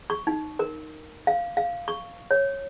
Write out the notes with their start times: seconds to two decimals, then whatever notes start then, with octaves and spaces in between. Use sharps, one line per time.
0.10 C#6
0.27 D#4
0.59 A#4
1.27 F5
1.57 F5
1.88 C#6
2.31 C#5